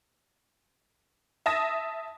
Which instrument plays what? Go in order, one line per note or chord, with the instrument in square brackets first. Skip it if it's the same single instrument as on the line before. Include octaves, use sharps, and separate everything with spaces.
[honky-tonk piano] E5 A5 D#6 A#6